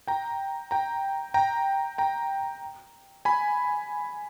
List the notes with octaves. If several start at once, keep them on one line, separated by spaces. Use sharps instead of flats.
G5 A#5
G5 A#5
G5 A#5
G5 A#5
G#5 B5